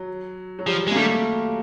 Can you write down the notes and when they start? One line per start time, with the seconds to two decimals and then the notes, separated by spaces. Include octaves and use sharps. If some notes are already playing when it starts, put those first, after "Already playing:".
Already playing: F#3
0.59 F#3
0.67 F3 G3
0.87 G#3
0.91 A#3
0.96 G3 A3